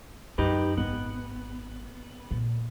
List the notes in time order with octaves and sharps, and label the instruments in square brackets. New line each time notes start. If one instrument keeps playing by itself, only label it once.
[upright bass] F#2 [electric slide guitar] D#4 G4 B4
[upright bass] G#1 [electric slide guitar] B3
[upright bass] A#2